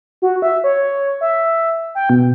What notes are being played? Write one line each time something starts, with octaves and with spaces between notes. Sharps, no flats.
F#4
E5
C#5
E5
G5
B2